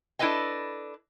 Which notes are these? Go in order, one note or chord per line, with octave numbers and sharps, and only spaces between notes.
D4 E4 A4 B4 D#5 G5